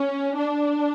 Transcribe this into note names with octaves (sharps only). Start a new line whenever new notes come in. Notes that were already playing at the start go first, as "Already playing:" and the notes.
Already playing: C#4
D4